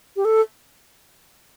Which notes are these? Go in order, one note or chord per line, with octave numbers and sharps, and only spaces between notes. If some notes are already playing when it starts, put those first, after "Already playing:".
G4
A4